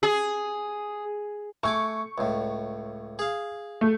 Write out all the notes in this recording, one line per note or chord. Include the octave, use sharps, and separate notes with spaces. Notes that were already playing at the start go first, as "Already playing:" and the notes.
G#4
A3 G#5 C#6 D6
C#2 A2
G#4 F5
A3